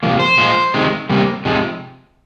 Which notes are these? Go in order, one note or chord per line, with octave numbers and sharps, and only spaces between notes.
C3 F3 A#3
C5
A#2 F3 G#3
C3 D#3 G#3
C3 G3 A#3
C3 F3 G#3